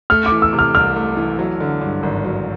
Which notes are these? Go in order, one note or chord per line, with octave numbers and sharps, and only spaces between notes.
A3 F6
D6
E3
E6
C3
F6
C2 F6
A3
E3
F#3
D3
G2
G#1
F#3